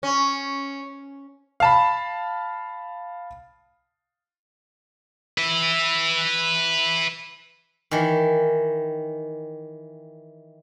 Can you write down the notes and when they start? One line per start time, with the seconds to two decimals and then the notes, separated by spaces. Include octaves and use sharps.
0.03 C#4
1.60 F5 A5 B5
5.38 B4 E5
7.91 D#3 E3